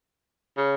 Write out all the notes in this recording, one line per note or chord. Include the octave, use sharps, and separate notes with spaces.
C#3